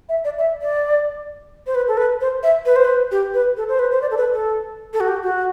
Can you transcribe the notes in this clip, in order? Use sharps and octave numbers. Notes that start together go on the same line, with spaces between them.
E5
D5
E5
D5
C5
B4
A4
B4
C5
E5
B4
C5
B4
G4
B4
A4
C5
B4
C5
D5
A4
B4
A4
A4
F#4
G4
F#4